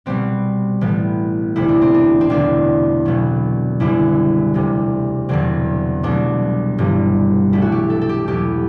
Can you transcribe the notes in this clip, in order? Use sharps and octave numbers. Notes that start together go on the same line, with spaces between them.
C2 B2 G3 B3 C4
A1 A2 E3 B3
E1 D2 C3 E3 E4
D4
C4
D4
C4
E1 E2 D3 D4
B1 B2 F#3 B3
F#1 F#2 D3 G3 B3 E4
E1 D2 C3
E1 E2 D3 F#3 C4
C2 B2 F#3 A3 D4
G1 G2 E3 G3
B1 B2 F#3 A3 E4
F#4
G4
A4
A4
G4
E2 B2 F#3 B3 G4